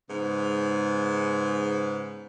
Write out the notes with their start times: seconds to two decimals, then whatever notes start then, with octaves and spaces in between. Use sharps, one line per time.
0.10 G#2 C#3 B3